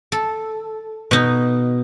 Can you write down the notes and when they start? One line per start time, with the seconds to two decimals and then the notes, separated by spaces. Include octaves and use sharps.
0.12 A4
1.11 B2 D#4